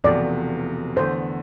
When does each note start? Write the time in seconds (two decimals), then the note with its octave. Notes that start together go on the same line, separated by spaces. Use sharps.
0.04 E1 E2 C3 F3 A3 D5
0.96 E2 D3 A3 C5